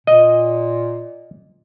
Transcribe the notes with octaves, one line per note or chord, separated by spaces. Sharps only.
A#2 D#5